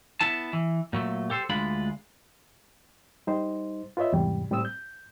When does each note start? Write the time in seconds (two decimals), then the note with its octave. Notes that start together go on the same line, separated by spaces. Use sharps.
0.20 B3 E4 A5
0.53 E3
0.93 A#2 F#3 A3
1.30 G4 A4 C5
1.49 D2 G#3 D4 F4 B5
3.27 G3 D#4 C5
3.97 F4 B4 C#5 D#5 E5
4.13 E2 G#2 C3 G3
4.51 A2 G3 C4 D#6 E6
4.65 G6